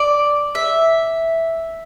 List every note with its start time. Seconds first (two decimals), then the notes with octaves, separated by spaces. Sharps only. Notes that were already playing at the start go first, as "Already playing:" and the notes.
Already playing: D5
0.55 E5